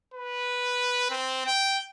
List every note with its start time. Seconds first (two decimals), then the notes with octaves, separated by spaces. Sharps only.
0.14 B4
1.11 C4
1.46 G5